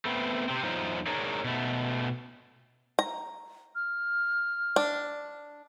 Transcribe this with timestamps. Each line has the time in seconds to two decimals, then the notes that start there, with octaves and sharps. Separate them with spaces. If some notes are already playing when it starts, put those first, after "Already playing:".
0.05 A3 B3 C4
0.48 C3 C4
0.63 E2 F#3 D#4 F4 C5 D#5
1.07 D4 D#4 G#4 A#4 C#5 D5
1.44 B2 A3
2.99 A#5
3.75 F6
4.76 D4